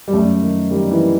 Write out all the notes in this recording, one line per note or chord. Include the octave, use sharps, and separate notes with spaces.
G3
F#2 A3
D#3
D#3 G3
E3